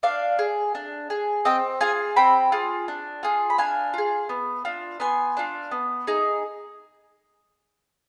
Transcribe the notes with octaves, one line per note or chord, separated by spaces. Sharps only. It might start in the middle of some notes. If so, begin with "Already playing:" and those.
D4 D5 F5
G#4
D4
G#4
C4 D#5 G5
F4 G#4 F5 G#5
C4 G5 B5
F4 G#4
D4
F4 G#4
B5
D4 F5 G#5
F4 G#4
B3
D4 F4
B3 G#5 C6
D4 F4
B3
D#4 G#4